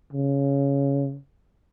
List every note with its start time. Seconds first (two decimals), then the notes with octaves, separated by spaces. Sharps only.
0.13 C#3